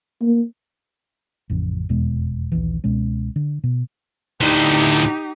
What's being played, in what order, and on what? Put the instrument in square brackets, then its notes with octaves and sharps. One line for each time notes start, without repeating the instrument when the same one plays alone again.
[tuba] A#3
[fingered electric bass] A1 F2 C#3
F1 E2 B2 G#3
A#1 D#2 E3
C#2 B2 G#3 C#4
D3
B2
[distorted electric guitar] D2 A2 [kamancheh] D#4 G4